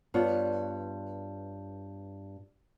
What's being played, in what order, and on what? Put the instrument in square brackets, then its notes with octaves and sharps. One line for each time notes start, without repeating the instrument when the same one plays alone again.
[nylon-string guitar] G2 B3 F4 C#5